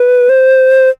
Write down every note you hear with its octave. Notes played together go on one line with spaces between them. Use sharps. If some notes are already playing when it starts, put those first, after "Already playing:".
Already playing: B4
C5